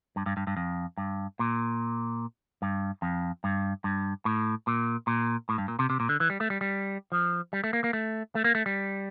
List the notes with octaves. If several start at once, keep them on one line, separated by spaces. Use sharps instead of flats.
G2
G2
G2
G2
F2
G2
A#2
G2
F2
G2
G2
A2
A#2
A#2
A2
G2
A#2
C3
C3
A#2
D3
E3
G3
A3
G3
G3
F3
G3
A3
A#3
A#3
A3
A3
A#3
A3
G3